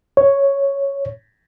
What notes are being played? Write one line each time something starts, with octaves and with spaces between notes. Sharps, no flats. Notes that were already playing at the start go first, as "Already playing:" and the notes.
C#5